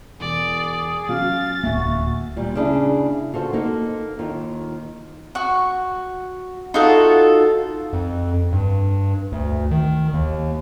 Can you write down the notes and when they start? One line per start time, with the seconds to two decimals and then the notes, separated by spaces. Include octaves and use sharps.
0.20 E1 G#4 D5
1.09 F#3 C#4 F5 A6
1.64 D1 A#3 F#4 E5 G#5
2.36 A#2 G3
2.55 C#3 D4 E4
3.33 F4 F#4 A4 C5
3.53 A#3 D#4 A4
4.19 D#2 D#3 F4
5.35 F#4 C#6
6.74 D#4 F4 F#4 A4
7.93 F2
8.52 G2
9.32 D2
9.71 D#3
10.14 D#2